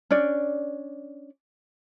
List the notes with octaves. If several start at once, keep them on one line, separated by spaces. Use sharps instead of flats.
C#4 D4 D5